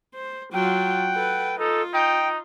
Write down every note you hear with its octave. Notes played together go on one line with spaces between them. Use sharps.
C5
F#3 F4 F#5 G5
A4 B4
D#4 F4 A4
D#4 G5